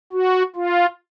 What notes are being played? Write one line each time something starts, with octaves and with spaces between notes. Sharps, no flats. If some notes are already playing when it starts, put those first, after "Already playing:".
F#4
F4